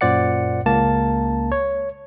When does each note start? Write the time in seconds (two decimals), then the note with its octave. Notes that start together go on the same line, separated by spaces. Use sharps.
0.01 F#2 A#2 C5 D5 F#5 C#7
0.66 C#2 A#3 A5
1.52 C#5